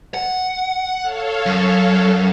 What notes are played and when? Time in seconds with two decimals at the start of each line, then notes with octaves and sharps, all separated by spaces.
0.14 F#5
1.03 A4 C#5 F5
1.46 F#2